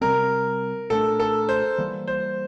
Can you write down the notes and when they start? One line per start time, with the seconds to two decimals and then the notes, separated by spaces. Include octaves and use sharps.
0.01 C3 G3 C4 A#4
0.90 A#2 A3 D4 A4
1.20 A4
1.49 C5
1.78 E3 G3 A#3
2.08 C5